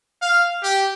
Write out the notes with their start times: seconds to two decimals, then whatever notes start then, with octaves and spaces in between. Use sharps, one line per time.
0.22 F5
0.63 G4